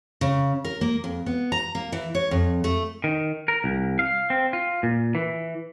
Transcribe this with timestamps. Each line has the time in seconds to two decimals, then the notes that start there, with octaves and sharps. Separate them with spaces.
0.21 C#3
0.64 A#4
0.81 A#3
1.04 F2
1.26 B3
1.52 A#5
1.75 A#3
1.92 E3
2.15 C#5
2.31 F2
2.64 A3
3.04 D#3
3.48 A#4
3.64 C2
3.99 F5
4.30 C4
4.53 F4
4.83 A#2
5.15 E3